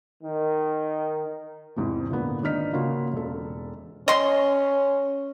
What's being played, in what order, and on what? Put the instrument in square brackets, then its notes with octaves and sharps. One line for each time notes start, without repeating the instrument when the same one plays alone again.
[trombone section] D#3
[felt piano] E2 G#2 C3 E3
A#2 D3 A#3 B3
G#1 D4 D#4 F6 B6
C#3 A#3 F4 F#4
E1 A4
[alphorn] C#4 [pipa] D#5 C6